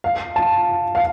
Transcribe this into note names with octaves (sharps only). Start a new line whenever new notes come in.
F5
A5
F5